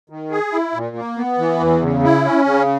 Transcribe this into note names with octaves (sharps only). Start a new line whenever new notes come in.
D#3
G#4
E4
A#2
A#3
B3
E3
E2
C#3
E4
C#4
C#3